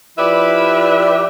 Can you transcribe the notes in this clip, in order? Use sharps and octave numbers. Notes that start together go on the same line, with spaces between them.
F3 E4 G4 B4 D5 E5